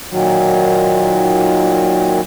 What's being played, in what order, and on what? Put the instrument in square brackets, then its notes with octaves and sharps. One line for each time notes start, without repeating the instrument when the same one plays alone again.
[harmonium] A#2 D#3 F#3